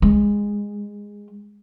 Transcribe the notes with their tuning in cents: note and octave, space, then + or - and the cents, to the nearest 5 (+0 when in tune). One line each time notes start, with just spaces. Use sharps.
G#3 -15